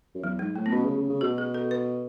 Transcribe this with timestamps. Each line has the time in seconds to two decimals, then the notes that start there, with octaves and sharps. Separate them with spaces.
0.15 F#2
0.23 E2 F#3
0.39 G#2 G#3
0.56 A2 A3
0.66 B3
0.72 B2 C#4
0.85 C#3
0.97 C#3
1.10 C#3
1.21 B2 F#4
1.38 G#4
1.54 A4
1.71 B4